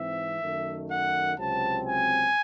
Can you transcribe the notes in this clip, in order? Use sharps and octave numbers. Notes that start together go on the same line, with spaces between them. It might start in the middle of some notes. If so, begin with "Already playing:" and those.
Already playing: G#2 E3 C4 E5
F#2 D#3 A3
F#5
C#2 C3 F#3 C4 A5
G#5